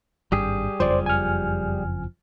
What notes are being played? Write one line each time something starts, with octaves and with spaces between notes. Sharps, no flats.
G#1 G2 G3 G4 G#4
F#1 F2 F3 C5 D5
G#5 F6